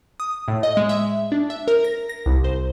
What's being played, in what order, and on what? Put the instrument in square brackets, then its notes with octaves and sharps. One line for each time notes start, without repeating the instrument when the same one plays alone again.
[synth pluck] D#6
A2
D#5
G#3
E5
D4
E5
A#4
A#6
A#6
C2
C5